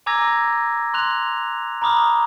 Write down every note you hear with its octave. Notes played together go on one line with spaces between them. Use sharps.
G#5 A#5 D6 E6 G#6 A#6
C6 F#6 F7
A#5 B5 D6 D#6 F6